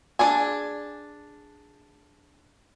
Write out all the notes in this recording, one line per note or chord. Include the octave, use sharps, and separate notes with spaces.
D4 G#4 G#5